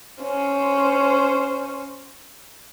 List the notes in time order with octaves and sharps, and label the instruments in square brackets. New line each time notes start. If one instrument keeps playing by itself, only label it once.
[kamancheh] C#4 C5